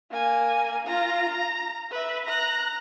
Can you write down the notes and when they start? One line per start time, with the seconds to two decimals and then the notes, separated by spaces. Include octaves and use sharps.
0.11 A#3 G#5
0.86 F4 A#5
1.31 A#5
1.91 B4 E5
2.26 A#5 F#6